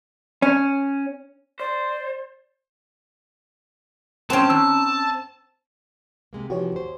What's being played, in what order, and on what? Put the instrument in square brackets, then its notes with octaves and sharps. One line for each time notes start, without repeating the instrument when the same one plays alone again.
[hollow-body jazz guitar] C#4
[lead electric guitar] C5 [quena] D5
[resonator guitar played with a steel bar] F#3 C5 G5 [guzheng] C4 C#4 [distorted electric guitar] A5
[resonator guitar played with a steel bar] D#3 [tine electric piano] E6
[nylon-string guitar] C3 G#3 A#3
[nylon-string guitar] C3 E3 F3 [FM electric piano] F#4 G4 C#5
[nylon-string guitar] D#2 C5